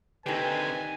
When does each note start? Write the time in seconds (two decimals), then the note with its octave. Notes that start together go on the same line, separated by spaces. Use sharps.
0.26 D3 D#3 C4 G4 B4 G#5